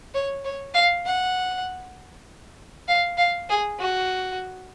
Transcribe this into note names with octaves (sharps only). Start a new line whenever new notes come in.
C#5
C#5
F5
F#5
F5
F5
G#4
F#4